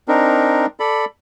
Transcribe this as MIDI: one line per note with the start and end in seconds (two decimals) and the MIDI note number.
0.08 0.66 60
0.08 0.66 62
0.08 0.66 63
0.08 0.66 70
0.80 1.05 69
0.80 1.05 74
0.80 1.05 83